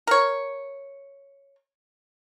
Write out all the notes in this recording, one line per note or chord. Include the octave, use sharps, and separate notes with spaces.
A#4 C#5